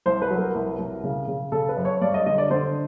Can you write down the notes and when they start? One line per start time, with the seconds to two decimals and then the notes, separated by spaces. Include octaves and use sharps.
0.06 C2 C5
0.22 B4
0.30 F#3
0.38 A#4
0.55 C2
0.79 C2
1.03 C#3
1.28 C#3
1.52 C#3 A4
1.69 B4
1.77 F#2
1.85 C#5
2.01 G2 D5
2.14 D#5
2.26 D3 D#5
2.38 D5
2.50 D3 C5